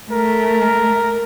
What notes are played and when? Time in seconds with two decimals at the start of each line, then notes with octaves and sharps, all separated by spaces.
0.12 A3 A#4